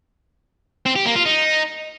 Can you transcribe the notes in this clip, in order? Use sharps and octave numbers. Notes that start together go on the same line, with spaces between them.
C4
G4
A#3
F4
D#4